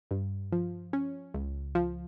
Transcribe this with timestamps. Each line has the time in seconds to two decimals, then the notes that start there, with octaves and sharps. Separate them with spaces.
0.11 G2
0.52 F3
0.93 C#4
1.34 C#2
1.75 F3